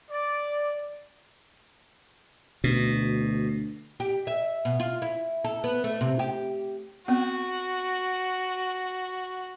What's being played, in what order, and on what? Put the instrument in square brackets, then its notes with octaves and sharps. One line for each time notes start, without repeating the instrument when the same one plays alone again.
[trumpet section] D5
[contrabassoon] D2 [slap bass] B2
[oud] G4
E5
B2
F4
E4
A4
B3
A3
C3
G4
[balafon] B3 C4 [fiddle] F#4